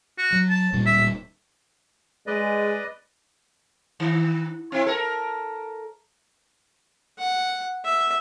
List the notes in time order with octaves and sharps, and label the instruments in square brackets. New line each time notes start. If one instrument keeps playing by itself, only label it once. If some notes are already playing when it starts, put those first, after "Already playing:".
[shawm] F#4
[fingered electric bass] F#3
[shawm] A5
[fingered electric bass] D1 A#2 G3
[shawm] E5
[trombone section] G#3 [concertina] B4 D5 D#5
[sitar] D#3
C4 E4
A4 A#4
[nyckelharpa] F#5
E5